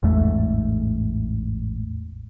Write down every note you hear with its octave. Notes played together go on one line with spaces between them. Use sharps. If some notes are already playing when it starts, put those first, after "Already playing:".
A1 E2 G#2 A3